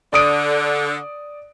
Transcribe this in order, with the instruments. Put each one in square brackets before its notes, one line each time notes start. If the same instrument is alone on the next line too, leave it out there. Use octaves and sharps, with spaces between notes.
[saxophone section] D3 [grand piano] D5 D#6 D7